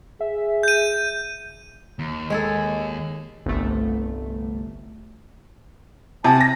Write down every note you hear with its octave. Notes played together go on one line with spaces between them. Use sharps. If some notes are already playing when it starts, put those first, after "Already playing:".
G#4 E5
G6 D#7
D#2
G#3 G#4 A4
G1 C2 A3
C3 F#5 G#5 A5
A#6